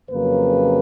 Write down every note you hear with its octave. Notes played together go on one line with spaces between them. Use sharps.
F2 C#3 F#3 A#3 B4